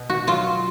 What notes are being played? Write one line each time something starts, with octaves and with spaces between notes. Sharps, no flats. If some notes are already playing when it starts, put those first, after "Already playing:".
Already playing: B2
F#4
F#3 F4